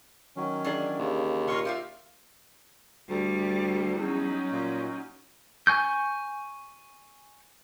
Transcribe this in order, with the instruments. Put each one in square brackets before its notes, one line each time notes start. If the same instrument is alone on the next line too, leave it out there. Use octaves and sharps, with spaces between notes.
[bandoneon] D#3 F#3 C#4
[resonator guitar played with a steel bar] E3 D4 G#4
[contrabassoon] D#2 [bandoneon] C#3
[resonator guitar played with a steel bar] A#2 F4 A#4 [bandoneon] F5 C6 C#6
[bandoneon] F4 [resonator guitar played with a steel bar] G4 E5 F5
[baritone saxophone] D2 [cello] G3
[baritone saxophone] E2 [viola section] F#3 C#4 D#4
[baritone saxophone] A#2
[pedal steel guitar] G#5 C#6 G6